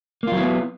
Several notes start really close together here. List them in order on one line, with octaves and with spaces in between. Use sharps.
A#3 F4 F#3 E4 B3